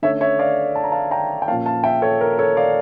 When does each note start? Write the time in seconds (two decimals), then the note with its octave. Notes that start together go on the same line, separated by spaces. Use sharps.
0.02 D3 A3 C#4 C#5 E5
0.21 C#5 E5
0.39 D5 F5
0.75 A5
0.84 A#5
0.92 F5 A5
1.11 G5 A#5
1.42 G5
1.48 A#2 F3 A#3 C#4 F5 A5
1.66 F5 A5
1.84 E5 G5
2.02 A4 C#5
2.21 A#4
2.39 A4 C#5
2.57 D5 F5